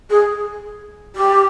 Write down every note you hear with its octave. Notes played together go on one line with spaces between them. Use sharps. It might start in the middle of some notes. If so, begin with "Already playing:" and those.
G#4
G4